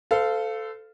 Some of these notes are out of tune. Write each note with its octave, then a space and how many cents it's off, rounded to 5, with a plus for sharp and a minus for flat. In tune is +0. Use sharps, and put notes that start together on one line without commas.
A4 +0 C5 -40 F5 -10